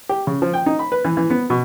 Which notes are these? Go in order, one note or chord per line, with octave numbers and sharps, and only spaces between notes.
G4
C#3
F3
G5
D#4
B5
B4
E3
E3
B3
B2